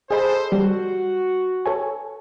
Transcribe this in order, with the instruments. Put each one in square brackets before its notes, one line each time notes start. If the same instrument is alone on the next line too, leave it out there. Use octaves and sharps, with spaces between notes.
[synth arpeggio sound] G#4 D#5 B5 [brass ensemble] A4 C5
[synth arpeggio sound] G3 C7 [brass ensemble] F#4
[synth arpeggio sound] A4 C#5 G#5